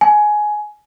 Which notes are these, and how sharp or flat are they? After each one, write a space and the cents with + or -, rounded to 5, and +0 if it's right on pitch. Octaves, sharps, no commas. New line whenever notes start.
G#5 +15